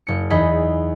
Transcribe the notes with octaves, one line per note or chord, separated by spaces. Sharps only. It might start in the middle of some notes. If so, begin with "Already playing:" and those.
F#1 C#7
E2 D#4 G#4 D#5 B5 A#6